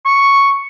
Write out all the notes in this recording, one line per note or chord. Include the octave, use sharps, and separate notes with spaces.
C#6